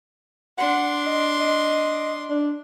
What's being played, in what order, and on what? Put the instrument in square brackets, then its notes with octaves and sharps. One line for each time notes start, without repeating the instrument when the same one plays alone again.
[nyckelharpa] D4 C6 [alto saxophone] F#5
[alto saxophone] D#5
D#5
D4